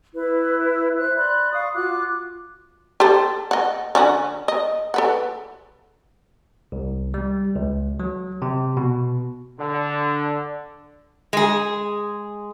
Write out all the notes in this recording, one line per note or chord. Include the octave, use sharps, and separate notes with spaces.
E4 B4
C5 E5 F#6
D5 B5 C6 F#6
F5 C#6 D#6
F4 F#4 D6 F#6
G4 A4 C5
D#5 F#5
D3 C#4 F#4
D#5
A4 B4 F#5
C2
G3
C#2
F#3
C3
B2
D3
G#3 G#4